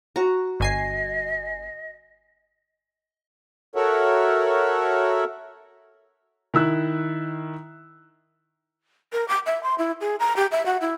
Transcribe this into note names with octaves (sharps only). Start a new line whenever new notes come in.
F#4 A#5
G1 D#5 G#5 C7
F#4 A4 A#4 C#5 E5 F#5
D#3 E4 E6 F#6
A#4
D6
E5
C6
E4
G#4
A#5
G4
E5
F#4
E4